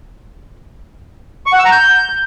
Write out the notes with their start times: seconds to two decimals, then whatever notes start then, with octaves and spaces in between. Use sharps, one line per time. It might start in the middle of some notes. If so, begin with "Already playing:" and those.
1.46 C#6
1.53 F#5
1.59 E6
1.65 A#5
1.72 G6